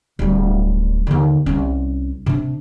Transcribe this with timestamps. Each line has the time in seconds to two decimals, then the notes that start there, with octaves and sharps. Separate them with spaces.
0.19 D1 G3
1.07 D#2 D3
1.46 C2 C#4
2.26 C3 D4